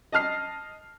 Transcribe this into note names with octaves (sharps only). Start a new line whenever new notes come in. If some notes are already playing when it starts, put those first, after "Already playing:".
D#5 A5 F6 C7